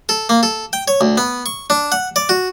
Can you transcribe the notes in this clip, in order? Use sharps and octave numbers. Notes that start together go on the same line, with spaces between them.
A4
A#3
A4
G5
C#5
D2
B3
C#6
D4
F#5
D5
F#4